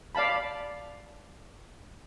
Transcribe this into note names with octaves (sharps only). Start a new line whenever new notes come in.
D5 F5 A5 B5